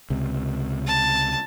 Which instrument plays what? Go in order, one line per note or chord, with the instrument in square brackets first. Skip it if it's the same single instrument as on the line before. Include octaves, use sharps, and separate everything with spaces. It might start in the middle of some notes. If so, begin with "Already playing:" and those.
[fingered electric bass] C#2 C3
[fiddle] A5